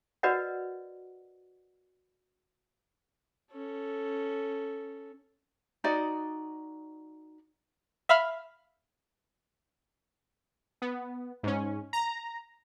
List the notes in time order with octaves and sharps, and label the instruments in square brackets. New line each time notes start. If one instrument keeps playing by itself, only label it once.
[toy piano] F#4 A#4 B4 D5 D#5 F#5
[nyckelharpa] C#4 A4
[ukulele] D#4 F#4 D5 D#5
[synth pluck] E5 F5 B5 F6
[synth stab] B3
G#2 C#4
A#5